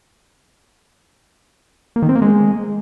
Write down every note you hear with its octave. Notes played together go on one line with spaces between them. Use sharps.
A#3
D#3
C4
A#3
G#3